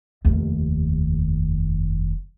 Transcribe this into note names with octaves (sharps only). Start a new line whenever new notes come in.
F1 D#2